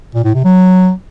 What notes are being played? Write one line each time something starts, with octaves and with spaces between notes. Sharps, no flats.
A#2
A2
C3
F#3